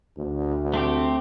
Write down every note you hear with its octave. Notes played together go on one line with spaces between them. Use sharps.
D2
A3 C4 G4